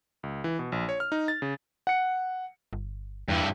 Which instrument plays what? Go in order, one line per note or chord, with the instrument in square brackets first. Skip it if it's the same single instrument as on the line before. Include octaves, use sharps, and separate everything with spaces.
[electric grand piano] C#2
E3
B2
A#1
C#5
F6
D#4
A6
C#3
F#5 C#7
[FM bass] G1
[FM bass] E2 [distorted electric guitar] G2 E3